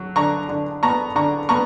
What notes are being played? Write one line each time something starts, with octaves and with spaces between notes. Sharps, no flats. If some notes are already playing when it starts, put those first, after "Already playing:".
Already playing: F#3
D3 A#5 C#6
D3
B3 A#5 C#6
D3 A#5 C#6
B3 A#5 C#6